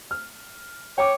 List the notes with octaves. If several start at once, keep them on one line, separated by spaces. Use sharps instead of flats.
F6
C#5 G5 D6